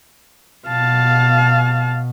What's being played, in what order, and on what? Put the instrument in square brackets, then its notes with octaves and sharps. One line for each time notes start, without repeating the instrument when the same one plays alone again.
[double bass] B2 [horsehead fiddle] F5 A5